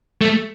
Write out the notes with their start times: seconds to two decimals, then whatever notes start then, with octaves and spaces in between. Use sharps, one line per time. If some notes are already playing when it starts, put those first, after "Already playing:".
0.21 A3